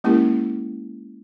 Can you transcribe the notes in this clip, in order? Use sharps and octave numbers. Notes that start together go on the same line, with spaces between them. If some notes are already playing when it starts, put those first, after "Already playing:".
G#3 A#3 C#4 E4 G4 A#4